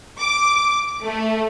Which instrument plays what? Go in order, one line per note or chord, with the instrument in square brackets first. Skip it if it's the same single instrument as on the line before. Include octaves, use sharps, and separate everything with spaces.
[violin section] D6
A3